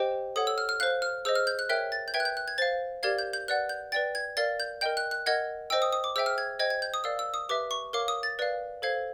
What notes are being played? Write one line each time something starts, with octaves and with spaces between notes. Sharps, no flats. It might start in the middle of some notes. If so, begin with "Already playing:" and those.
Already playing: G4 C5 D#5 G5
A4 C#5 F#5 D#6
E6
F6
F6
C5 F5 F#6
F6
G#4 C5 D#5 E6
F6
G6
F#6
A#4 C#5 E5 G5 F#6
A6
G6
B4 E5 G5 G#6
F#6
G6
F#6
G#6
C5 F5 A6
G4 A#4 D5 F5 G#6
G6
G6
B4 D5 F#5 F#6
G6
B4 D5 G5 A6
G#6
A#4 D5 F5 A6
G6
A#4 D#5 G5 G6
F#6
F#6
A#4 D#5 F#5 G#6
C5 D#5 G5 E6
D#6
D#6
D6
G#4 C5 E5 G5 E6
F6
G#6
C5 D#5 G5 G#6
G#6
G6
D#6
A#4 D5 F5 E6
E6
D#6
G4 B4 E5 D6
C#6
A#4 C#5 F5 D6
D#6
A6
B4 D5 F5
A4 C5 F5 G#6